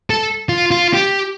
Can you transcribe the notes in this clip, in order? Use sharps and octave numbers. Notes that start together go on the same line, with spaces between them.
A4
F4
F4
G4